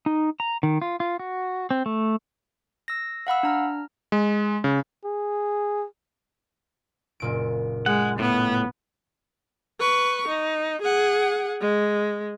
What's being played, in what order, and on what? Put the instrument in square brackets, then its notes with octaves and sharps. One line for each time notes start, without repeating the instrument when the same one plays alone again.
[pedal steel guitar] D#4
A#5
D#3
F4
F4
F#4
C4
A3
[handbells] E6 A#6
F5 F#5 B5 E6
D4 A#5 F6
[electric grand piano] G#3
C#3
[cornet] G#4
[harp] F#1 A#2 D7
[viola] G#3 [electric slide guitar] F#5
[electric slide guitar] A2 [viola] B3
[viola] B4 C#6
D#4
G#4 F#5
G#3